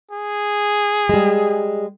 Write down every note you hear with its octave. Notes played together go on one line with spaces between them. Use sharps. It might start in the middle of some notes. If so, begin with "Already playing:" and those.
G#4
G3 G#3